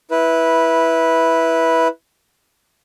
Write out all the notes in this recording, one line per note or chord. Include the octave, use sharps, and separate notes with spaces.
E4 B4